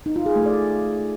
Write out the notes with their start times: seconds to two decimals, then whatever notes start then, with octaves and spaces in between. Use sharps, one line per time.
0.06 D#4
0.16 F4
0.26 G#4
0.36 A3
0.46 D5